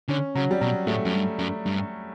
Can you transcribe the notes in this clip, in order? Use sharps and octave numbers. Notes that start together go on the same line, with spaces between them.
D3 C#4
C#3 F#3
G3
B2 F#3
A2 A3
F#2
G2
F#2
G2